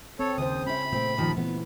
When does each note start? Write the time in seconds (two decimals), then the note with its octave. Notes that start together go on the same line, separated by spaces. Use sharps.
0.19 C4 A4 C#5
0.38 D#2 C#3 C5 D#6
0.66 C#4 E4 B5
0.92 A#2 A3 C4
1.17 D#2 D#3 F3
1.37 E3 B3